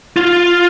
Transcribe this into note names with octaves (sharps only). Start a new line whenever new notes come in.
F4